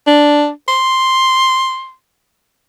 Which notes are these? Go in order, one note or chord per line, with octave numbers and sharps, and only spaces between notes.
D4
C6